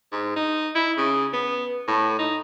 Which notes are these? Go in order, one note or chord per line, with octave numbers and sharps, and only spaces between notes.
G#2
D#4
E4
C#3
B3
A2
D#4